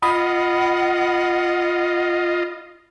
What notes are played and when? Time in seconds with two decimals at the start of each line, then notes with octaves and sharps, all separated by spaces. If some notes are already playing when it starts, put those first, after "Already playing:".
0.02 F4 D#5 F#5 B5 D#6